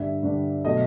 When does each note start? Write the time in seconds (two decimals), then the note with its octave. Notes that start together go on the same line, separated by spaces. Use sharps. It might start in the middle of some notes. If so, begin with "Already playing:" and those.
Already playing: G2 D3 G3 E5
0.23 G2 D3 G3
0.65 B2 F#3 A3 D#5